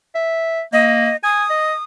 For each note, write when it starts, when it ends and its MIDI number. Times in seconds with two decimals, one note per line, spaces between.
0.15 0.63 76
0.73 1.10 58
0.73 1.16 75
1.24 1.45 80
1.24 1.83 87
1.50 1.73 75